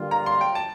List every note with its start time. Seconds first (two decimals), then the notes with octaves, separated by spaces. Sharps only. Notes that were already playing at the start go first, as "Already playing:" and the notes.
Already playing: D3 G3 A#3 F4
0.11 A#5
0.26 C6
0.41 G5
0.55 A5